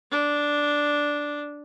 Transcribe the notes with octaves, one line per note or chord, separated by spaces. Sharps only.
D4